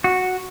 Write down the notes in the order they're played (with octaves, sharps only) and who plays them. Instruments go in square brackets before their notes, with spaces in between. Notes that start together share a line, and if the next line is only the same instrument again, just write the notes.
[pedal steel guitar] F#4